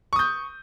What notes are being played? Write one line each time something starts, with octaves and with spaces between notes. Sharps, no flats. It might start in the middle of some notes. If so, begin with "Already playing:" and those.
C#6 D#6 G6